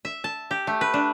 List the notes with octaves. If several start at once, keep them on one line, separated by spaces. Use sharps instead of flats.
E5
A5
G4
A3
B4
D4